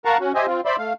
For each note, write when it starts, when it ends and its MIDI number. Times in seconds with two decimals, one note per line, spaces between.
0.05 0.18 70
0.05 0.18 77
0.05 0.18 78
0.05 0.18 81
0.05 0.18 82
0.05 0.18 85
0.20 0.32 61
0.20 0.32 66
0.35 0.46 67
0.35 0.46 72
0.35 0.46 75
0.35 0.46 76
0.35 0.46 80
0.47 0.61 60
0.47 0.61 65
0.65 0.76 72
0.65 0.76 74
0.65 0.76 76
0.65 0.76 83
0.65 0.76 84
0.78 0.93 57
0.78 0.93 77